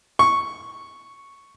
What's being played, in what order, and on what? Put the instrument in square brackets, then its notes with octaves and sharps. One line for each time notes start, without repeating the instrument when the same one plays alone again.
[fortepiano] C#6